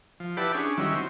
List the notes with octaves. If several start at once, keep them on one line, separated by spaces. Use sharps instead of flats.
F3
E4 G4 B4 D5 F#5 A5
C#4 D4 G#4
D#3 F#3 G3 C#4 E4
C4